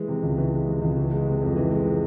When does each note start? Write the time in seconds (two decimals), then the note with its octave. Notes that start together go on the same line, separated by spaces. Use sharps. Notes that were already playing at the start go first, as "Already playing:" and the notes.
Already playing: E3 G#3
0.08 C3
0.23 C#2
0.37 E3
0.53 G#3
0.67 C3
0.82 C#2
0.96 E3
1.11 G#3
1.27 C3
1.41 F2
1.56 E3
1.71 G#3
1.85 C3